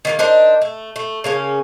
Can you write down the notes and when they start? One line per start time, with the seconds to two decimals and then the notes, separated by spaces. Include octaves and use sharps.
0.05 D#3 F#3 A#3
0.19 D4 D#4 A#4 C5
0.62 A3
0.96 A3
1.24 C#3 A#3 C#4